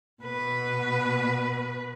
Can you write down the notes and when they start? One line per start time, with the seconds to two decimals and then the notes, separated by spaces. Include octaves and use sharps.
0.23 B2 B4